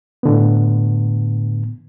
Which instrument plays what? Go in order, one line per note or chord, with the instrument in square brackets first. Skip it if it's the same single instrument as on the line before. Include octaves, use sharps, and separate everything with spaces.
[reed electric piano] A2 D3 B3